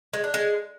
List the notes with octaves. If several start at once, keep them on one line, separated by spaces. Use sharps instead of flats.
G#3
D4
G#3